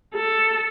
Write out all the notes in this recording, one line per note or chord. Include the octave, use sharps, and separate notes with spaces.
A4